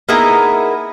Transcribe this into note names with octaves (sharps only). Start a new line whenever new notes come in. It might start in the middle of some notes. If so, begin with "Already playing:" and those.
A#3 B3 D#4 E4 G#4 A#4